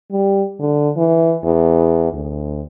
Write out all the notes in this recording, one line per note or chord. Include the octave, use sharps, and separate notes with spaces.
G3
D3
E3
E2
D2